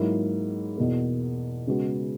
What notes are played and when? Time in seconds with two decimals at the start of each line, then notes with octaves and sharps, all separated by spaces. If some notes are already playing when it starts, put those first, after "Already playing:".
Already playing: G#2 F#3 A#3 E4
0.78 E2 B2 A#3
1.67 C#3 G#3 B3 F#4